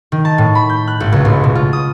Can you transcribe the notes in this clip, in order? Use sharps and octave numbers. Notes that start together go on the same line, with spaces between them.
D#3
A5
A2
B5
G6
F#6
G#1
C#2
A1
B2
F4
D#6